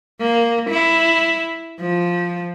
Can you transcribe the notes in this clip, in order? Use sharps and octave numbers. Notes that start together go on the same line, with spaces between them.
A#3
E4
F3